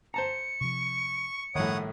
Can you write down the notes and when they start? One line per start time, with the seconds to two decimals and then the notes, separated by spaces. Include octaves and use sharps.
0.14 C5 A5 A#5 C#7
0.61 C3 F3 C#6
1.55 A#1 A2 D#3 G3 C#5 F#5 D#6